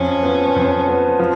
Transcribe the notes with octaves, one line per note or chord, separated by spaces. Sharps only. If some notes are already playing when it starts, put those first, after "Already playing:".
Already playing: F2 C#4
F3 B3
F2
F3 B3
F3